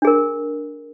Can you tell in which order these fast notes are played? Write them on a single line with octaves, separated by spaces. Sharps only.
D4 G#4 A#4